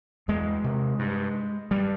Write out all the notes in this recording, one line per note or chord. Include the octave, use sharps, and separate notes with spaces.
E2 G#3
C3
G2
G2 G3